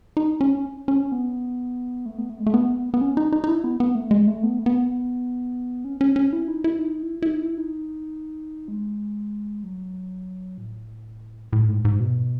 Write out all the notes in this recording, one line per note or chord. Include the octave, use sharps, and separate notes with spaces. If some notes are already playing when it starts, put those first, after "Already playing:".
D#4
C#4
C#4
B3
A3
B3
A3
G#3
A3
B3
B3
C#4
D#4
D#4
D#4
E4
B3
B3
A3
G#3
A3
B3
A3
B3
C#4
C#4
C#4
E4
D#4
E4
D#4
E4
E4
D#4
E4
D#4
G#3
F#3
A2
A2
G#2
G#2
B2